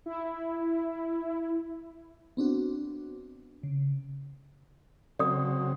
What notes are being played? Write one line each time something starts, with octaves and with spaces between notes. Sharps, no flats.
E4
B3 C4 D4 F#4
C#3
C#3 F#3 C4 D5 D#6